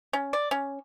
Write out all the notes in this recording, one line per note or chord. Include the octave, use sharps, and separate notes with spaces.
C#4
D5
C#4